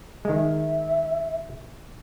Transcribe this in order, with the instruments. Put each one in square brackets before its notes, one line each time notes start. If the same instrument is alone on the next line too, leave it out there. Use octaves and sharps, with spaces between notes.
[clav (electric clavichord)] D#3 G#3 [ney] E5